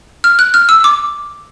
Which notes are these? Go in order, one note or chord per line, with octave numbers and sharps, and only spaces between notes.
F6
F#6
F6
E6
D6